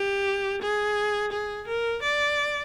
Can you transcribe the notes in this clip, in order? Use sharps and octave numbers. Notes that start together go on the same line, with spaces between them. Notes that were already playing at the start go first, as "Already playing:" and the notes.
Already playing: G4
G#4
G#4
A#4
D5